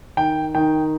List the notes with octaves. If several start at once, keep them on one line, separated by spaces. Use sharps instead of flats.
D#3 G5
D#3 G5